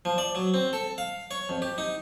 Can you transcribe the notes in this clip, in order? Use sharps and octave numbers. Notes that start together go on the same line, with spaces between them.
F3
D5
F#3
C4
A4
F5
C#5
F2
G4
D#4